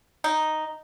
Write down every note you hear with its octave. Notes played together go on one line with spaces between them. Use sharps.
D#4